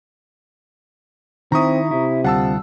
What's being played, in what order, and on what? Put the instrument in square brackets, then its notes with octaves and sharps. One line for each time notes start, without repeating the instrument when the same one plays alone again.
[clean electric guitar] D#3 E4 [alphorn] C4 [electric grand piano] A#5 C#6 D#6
[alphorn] C3 [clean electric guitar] E4
[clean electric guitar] D2 G3 F4 [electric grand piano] F#5 A5 E6